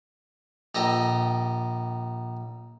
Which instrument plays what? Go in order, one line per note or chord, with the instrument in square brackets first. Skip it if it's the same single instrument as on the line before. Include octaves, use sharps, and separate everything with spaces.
[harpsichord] A#1 G4 A4 D#5